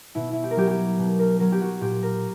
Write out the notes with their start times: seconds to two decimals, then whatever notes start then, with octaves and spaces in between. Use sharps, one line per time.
0.15 B2 E4
0.33 E4
0.44 G4
0.51 A#4
0.57 F#3 G4
0.71 G4
0.99 B2
1.19 A#4
1.40 F#3 A#4
1.52 G4
1.61 F#4
1.81 A#2 G4
2.02 A#4